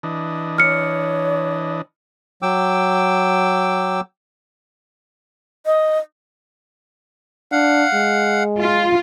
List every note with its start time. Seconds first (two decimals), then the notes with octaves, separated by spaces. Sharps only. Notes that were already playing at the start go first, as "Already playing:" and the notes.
0.03 E3 D4 D#5
0.58 C#5 F6 C#7
2.42 F#3 G5 D6 E6
5.66 D#5
7.52 D4 F5 F#5
7.94 G#3
8.61 F4